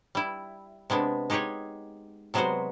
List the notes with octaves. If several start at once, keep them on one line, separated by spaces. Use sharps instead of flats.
G3 E4
C3 G#3 B3 D4
G#3 D#4 G4 G#4 C#5
C3 F#3 G#3 B3 F#4 C5